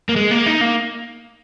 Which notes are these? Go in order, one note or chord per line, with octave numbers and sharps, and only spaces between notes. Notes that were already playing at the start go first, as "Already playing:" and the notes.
A#3
G#3
A#3
D#4
A#3